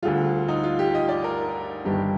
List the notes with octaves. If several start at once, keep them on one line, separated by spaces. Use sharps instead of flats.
D2 D3 G3 F4
D#4
F4
G4
D#5
D5
A#4
G1 G2 D#3 G3 D4 G4